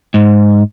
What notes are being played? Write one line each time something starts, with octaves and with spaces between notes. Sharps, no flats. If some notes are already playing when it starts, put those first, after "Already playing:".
G#2